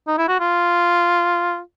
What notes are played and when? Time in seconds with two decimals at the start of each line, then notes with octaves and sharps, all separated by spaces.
0.08 D#4
0.18 E4
0.28 F#4
0.40 F4